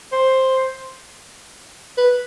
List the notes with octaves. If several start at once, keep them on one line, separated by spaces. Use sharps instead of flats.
C5
B4